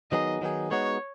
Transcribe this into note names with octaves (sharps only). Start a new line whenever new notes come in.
D#3 F#3 B3 D#4 G#4 D#5
D#3 F#3 B3 D#4 G#4
G#3 B3 D#4 F#4 C#5